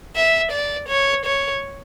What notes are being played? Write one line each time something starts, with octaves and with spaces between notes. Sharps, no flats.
E5
D5
C#5
C#5